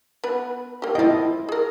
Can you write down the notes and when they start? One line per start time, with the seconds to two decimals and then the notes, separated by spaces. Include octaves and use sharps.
0.24 B3 B4
0.82 A#3 G4
0.95 F3 E4 D#5 G5
1.49 G#4 A#4